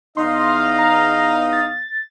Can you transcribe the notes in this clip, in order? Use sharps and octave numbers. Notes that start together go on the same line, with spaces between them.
E2 D#4 D#5 F5 C6
A#5
A6